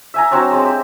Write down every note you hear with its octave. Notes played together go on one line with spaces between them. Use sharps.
E5 G#5 A#5
F#3 C4 D4 C#5
G#3 C4
G4